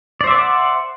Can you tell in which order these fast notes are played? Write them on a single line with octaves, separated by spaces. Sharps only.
D5 C5 E5 D6 F#5